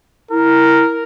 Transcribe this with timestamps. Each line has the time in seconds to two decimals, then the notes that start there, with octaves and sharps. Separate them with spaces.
0.31 E4 A#4